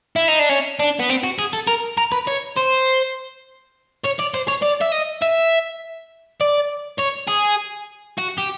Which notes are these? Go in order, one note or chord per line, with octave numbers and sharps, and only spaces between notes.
E4
D#4
D4
C#4
D4
B3
C4
F#4
G#4
A4
A#4
A#4
B4
C#5
C5
C#5
D5
C5
C#5
D5
E5
D#5
E5
D5
C#5
G#4
F#4
G4